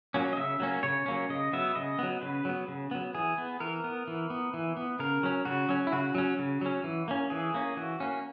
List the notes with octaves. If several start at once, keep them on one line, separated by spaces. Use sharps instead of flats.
F#3 A#3 C#4
D#5
C#3 E5
F#3 A#3 C#4
C#3 C#5
F#3 A#3 C#4
C#3 D#5
F#3 B3 E5
C#3 D#5
F#3 B3
C#3 B4
F#3 B3
C#3
F#3 B3
E3 G#4
B3
E3 A#4
B3
E3
B3
E3
B3
C#3 A#4
F#3 C#4
C#3 F#4
F#3 C#4
E4
C#3 F#4
F#3 C#4
C#3
F#3 C#4
E3
A#3 C#4
E3 G#4
A#3 C#4
E3 F#4
A#3 C#4